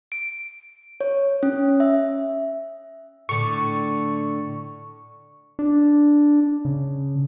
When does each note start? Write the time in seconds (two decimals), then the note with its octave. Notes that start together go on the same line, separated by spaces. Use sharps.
0.12 D7
1.01 C#5
1.43 C#4
1.80 E5
3.29 A2 D3 C#6
5.59 D4
6.65 C#3